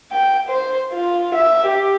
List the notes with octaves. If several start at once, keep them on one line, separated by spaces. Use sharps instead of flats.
G5
C5
F4
E5
G4